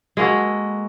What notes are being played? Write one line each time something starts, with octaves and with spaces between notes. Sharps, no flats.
G#3 A#3 F#4 A4